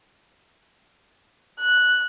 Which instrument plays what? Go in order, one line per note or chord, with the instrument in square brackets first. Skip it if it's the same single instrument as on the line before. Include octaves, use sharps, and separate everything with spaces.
[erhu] F#6